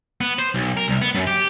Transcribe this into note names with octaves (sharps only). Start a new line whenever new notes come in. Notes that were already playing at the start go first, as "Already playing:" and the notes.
B3
C5
B1
A#4
C2
B3
F#2
G4